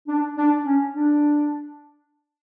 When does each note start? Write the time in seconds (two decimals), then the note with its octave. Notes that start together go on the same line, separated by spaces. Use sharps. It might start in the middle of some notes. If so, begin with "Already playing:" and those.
0.08 D4
0.37 D4
0.65 C#4
0.93 D4